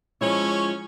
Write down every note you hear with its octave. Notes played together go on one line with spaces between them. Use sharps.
F3 G#3 C#4 E4 C#5